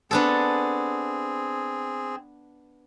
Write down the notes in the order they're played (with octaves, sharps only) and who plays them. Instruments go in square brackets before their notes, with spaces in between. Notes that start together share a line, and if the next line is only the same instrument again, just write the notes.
[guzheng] B3 D4 A4 [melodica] C4 G#4